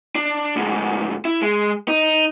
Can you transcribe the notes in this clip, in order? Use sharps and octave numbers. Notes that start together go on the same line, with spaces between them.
D4
D2 G#2
E4
G#3
D#4